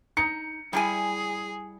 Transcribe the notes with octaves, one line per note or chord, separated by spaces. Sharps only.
D#4 C#7
G3 E4 G#4 G#5